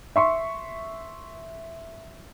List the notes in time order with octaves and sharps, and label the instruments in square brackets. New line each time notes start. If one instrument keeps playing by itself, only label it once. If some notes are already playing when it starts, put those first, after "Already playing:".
[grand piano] E5 C6 C#6